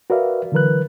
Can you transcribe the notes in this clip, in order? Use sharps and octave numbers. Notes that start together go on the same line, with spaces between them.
F#4 A#4 B4 D5 E5 F5
D3 E3 F#3 A#4 B4 F#6